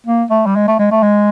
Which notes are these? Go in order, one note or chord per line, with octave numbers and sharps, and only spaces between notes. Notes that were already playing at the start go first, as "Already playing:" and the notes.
A#3
A3
G3
G#3
A3
G#3
A3
G#3